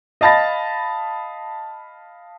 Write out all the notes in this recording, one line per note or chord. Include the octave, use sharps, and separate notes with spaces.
D#5 F5 A5 B5 A6 A#6